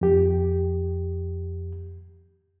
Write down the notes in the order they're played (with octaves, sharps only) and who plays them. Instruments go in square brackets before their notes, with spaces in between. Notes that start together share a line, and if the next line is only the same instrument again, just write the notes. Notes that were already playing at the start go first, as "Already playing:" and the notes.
[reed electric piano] F2 G4